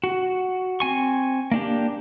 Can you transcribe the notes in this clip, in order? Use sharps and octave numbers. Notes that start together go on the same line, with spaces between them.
F#4
C4 G#5 C#6
A#3 D4 G4